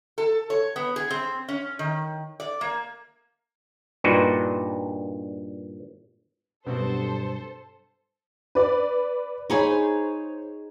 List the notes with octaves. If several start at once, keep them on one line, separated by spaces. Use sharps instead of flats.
A4
C#5
B3
G#4
C4
C#4
D#3
D5
A#3
G2 A#2 D4 D#4 F#4 B4
G2 B2 F#3 B3 C4 F#4 A4 C5
B4 D5
D#4 G#4 C5 C#5 B5